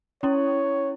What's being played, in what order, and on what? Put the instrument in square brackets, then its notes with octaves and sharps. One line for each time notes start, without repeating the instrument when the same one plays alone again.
[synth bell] C#4 E4 [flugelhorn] C#5